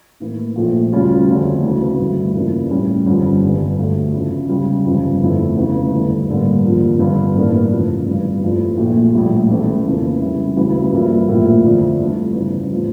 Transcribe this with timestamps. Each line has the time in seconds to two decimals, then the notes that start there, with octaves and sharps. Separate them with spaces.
0.20 A2 E3 A#3
0.56 A#1 A#2 F3 A3
0.92 D2 C#3 G3 C#4 F4
1.27 F1 F2 D3 A3
1.63 D2 C#3 E3
1.98 G2 D3 A3 E4
2.35 F2 C#3 E3 A#3 D4
2.70 A2 G3 C#4
3.06 G1 F2 D3 G3 C#4
3.43 G1 G2 D3
3.78 D2 D3 A3
4.13 E2 C#3 F3 C#4 E4
4.49 C#2 C#3 G3 C#4
4.85 G1 F2 C#3
5.21 F1 F2 D3 A3 E4
5.56 E1 E2 C#3 E3 A3
5.92 G2 D3 A3 E4
6.28 A1 G2 D3 G3 A#3
6.64 F2 D3 F3 A#3
6.99 G1 G2 D3
7.35 A1 G2 E3 A#3 D4
7.70 F1 F2 C#3 F3
8.07 G1 G2 E3
8.42 F2 E3 A3 D4 F4
8.77 A#1 A#2 A3
9.13 A#1 A2 G3
9.50 E1 E2 E3 A3 C#4
9.85 F1 F2 C#3 E3 A#3
10.21 C#2 C#3 G3 C#4 E4
10.57 D2 C#3 E3 G3
10.92 G2 F3 A#3 E4
11.28 A#1 A2 F3 A#3 E4
11.64 F2 D3 A3 D4 F4
11.99 G2 E3 A3
12.35 E2 C#3 G3
12.71 A2 F3